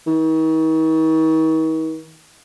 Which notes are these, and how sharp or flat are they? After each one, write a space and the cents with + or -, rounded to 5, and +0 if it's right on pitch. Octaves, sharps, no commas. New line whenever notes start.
D#3 +45